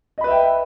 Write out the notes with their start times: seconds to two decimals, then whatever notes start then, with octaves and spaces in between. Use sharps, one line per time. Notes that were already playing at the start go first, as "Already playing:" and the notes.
0.18 D#5
0.21 B5
0.24 B4
0.27 E5
0.31 G5